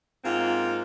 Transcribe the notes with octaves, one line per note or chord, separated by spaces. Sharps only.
G#2 A#3 C4 F4